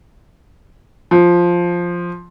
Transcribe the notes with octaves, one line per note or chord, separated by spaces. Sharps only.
F3